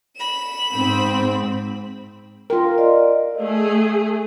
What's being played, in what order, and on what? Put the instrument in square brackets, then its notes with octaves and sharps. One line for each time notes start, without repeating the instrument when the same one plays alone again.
[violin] B5 E7
[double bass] G#2 [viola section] C4
[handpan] F4 A#4 [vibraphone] G5 C6
[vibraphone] D5 D#5 F5
[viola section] A3 G#4